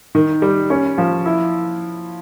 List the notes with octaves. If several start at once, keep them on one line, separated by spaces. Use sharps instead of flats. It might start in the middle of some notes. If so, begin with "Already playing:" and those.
D#3
G3
C#4
F3
E4